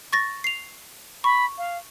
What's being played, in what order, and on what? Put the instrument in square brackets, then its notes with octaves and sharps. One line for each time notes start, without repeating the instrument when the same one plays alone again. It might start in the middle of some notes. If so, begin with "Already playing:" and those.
[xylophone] C#6 A6 A#6
C7 F7
[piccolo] B5 [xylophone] C#6
[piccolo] F5